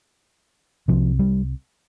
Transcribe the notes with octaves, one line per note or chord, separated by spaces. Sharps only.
C2 C3 F3
G3